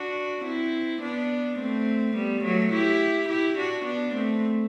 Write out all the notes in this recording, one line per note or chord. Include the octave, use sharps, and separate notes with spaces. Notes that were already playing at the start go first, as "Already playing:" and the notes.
Already playing: D4 F#4
C4 E4
B3 D4
A3 C4
G3 B3
F#3 A3
E4 G4
E4 G4
D4 F#4
B3 D4
A3 C4